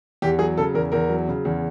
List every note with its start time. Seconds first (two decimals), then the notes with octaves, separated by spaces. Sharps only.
0.22 E2 G4
0.39 F#3 G#4
0.57 C#3 A4
0.74 E2 A#4
0.92 E2 A#4
1.09 F#3
1.28 C#3
1.45 E2